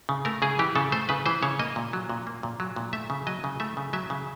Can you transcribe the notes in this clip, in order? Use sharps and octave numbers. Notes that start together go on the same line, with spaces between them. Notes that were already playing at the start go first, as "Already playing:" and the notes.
C#3
A3 A#4
C#3 G#4
E3 G4
C#3 A4
A3 C5
C#3 B4
E3 C5
C#3 C#5
A#3 D#5
A#2
F#3
A#2
A#3
A#2
F#3
A#2
A3 E5
C#3
F#3 D#5
C#3
A3 E5
C#3
F#3 E5
C#3